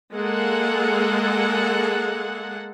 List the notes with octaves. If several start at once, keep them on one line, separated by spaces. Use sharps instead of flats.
G#3 A#3 G#4 A4 F#5